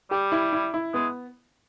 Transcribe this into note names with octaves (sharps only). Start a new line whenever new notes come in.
G3 G4
E4
E4
E4
G#3 B3